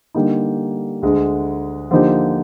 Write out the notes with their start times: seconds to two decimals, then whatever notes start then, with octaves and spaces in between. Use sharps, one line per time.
0.15 D3 G3 A#3 D#4
1.02 D2 D3 G#3
1.91 D3 F3 A#3 D#4 G4